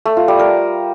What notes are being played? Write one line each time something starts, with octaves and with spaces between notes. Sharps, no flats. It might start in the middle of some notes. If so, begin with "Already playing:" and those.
A3
F4
G3
A#4